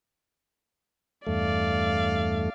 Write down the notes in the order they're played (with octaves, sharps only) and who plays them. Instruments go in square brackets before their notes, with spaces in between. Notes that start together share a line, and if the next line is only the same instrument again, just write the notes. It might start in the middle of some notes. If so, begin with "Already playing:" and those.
[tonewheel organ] E2 G2 A3 [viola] D5 F5